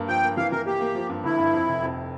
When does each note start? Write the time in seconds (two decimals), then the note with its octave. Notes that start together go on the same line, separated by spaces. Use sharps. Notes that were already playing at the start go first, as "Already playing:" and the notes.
Already playing: G2 A#3
0.08 F3 G5
0.23 A#3
0.37 E3 F5
0.52 E3 A#4
0.66 A#3 G4
0.81 A#3
0.95 F3
1.09 G2
1.24 G1 E4
1.38 G2
1.53 F2
1.67 F1
1.82 F2